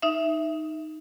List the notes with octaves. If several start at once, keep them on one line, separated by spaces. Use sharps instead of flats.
D#4 E5